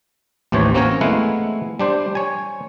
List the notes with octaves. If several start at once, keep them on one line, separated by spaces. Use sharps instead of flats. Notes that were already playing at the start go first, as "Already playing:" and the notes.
A1 D#2 E3 C5 C#5
A#3 C4 C#4 F#4 A#4 C#5
G#3 A3 B3 E4 F5 F#5
G3 D4 C5
C#5 G#5